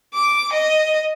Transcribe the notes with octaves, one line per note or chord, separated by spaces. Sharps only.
D6
D#5